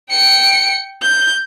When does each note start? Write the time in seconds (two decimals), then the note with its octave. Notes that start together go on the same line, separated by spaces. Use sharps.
0.10 G5 C#7
1.02 G6